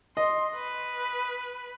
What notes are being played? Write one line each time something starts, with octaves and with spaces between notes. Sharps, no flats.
D#5 C6
B4